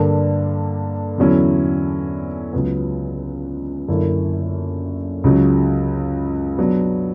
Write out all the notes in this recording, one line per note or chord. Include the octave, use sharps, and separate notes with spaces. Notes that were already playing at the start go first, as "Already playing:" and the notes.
Already playing: G2 D3 A#3 D4
E2 D3 F#3 C#4 E4
C#2 C#3 F#3 B3
F#2 D3 A#3 E4
C#2 C#3 F#3
B2 F#3 B3 D4